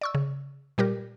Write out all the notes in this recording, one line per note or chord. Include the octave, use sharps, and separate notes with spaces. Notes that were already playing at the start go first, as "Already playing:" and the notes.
D5 C#6 E6
C#3
A#2 G3 G4 A#4